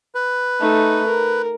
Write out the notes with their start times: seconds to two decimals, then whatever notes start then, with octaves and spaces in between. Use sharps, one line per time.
0.15 B4
0.60 A3 D#4
1.07 A#4